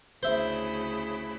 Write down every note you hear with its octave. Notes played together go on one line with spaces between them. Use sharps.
D2 C#3 E4 C5 E5